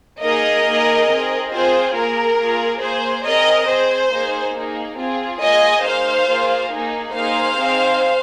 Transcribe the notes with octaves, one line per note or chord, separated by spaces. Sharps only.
A#3 D#4 G#4 A#4 D#5
A#3 D#4 G#4
C4 G#4
C4 F4 G#4 C5
A#3 G#4 A#4
A#3 F4 G#4
A#3 G#4 C5
C4 G#4 A#4 D#5
C4 G#4 C5
A#3 D#4 G#4
A#3 D#4 G#4
C4 F4 G#4
A#3 F4 G#4 D#5 G#5
A#3 D#4 G#4 C5 F5
A#3 F4 G#4
A#3 D#4 G#4
A#3 D#4 G#4 C5 F5
C4 D#4 G#4